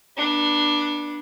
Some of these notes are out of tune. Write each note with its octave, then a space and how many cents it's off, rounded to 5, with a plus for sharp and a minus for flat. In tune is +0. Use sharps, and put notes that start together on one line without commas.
B3 -30 D4 +10